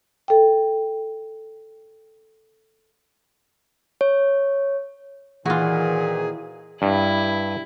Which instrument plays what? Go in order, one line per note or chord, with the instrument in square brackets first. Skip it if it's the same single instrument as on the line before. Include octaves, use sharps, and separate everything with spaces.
[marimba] A4 G5
[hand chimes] C#5
[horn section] A#2 D#3 [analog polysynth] E3 [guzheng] F4 F#4 [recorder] G#4
[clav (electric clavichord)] G2 [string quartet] E4